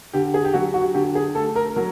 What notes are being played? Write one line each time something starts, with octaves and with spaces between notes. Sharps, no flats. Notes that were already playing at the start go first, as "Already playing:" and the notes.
D3 G4
G#4
G4
F#3 F#4
F#4
D3 G4
G#4
A3 A4
A#4
F#3 A#4